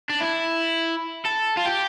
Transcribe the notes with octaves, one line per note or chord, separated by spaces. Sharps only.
D4
E4
A4
F4
G4